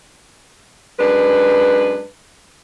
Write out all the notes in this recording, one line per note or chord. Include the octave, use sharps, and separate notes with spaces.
F#2 G#3 D4 B4